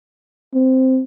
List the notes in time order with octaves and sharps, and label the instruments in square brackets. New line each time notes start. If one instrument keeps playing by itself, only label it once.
[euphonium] C4